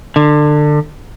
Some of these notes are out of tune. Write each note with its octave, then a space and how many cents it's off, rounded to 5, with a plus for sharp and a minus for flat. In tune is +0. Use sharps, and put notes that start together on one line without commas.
D3 +25